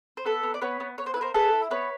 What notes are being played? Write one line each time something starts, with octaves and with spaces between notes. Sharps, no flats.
C5
B3 A4 B4
B3
D5
B3 B4 C#5
B3
B3 C#5
C5
E4 B4
A#4 C5
G#4 A4 B4
E4
B3 B4 C#5